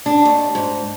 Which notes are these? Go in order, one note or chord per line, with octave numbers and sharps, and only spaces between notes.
D4
D#2
G#2